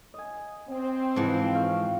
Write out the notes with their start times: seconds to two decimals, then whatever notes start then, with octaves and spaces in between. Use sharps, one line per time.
0.14 D#5 G#5
0.69 C4
1.16 G#2 E3 F3
1.55 F5 G5 C#6